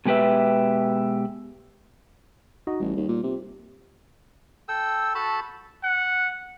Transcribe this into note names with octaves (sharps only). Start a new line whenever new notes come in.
B2 G#3 G4 B4 E5
D#4 F#4 D#5
A1 G3
D#2
A#2
C3
A4 G5 E6
F#4 A4 A5 B5
F#5